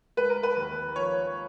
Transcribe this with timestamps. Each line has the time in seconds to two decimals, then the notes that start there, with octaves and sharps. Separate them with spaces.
0.17 G#3 B4
0.30 A#4
0.43 B4
0.56 D#2
0.96 F3 C#5